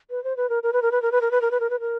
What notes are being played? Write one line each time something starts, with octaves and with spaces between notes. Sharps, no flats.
B4
C5
B4
A#4
A#4
B4
A#4
B4
A#4
B4
A#4
B4
A#4
B4
A#4
B4
A#4